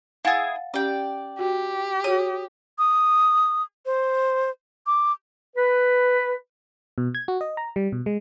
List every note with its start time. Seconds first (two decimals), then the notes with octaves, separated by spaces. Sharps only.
0.25 E4 G#4 F5 F#5 G#5 A6
0.74 C#4 G4 D5 G5
1.39 F#4 G4
2.04 F#4 G#4 C#5 D#6
2.78 D#6
3.86 C5
4.87 D6
5.56 B4
6.98 B2
7.15 G#6
7.28 F#4
7.41 D#5
7.57 A#5
7.76 G3
7.92 B2
8.06 G#3